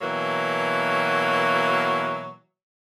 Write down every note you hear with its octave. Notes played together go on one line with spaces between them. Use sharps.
B2 E3 F#3 A#3